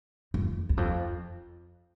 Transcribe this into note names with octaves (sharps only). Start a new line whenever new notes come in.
F2
E2
F2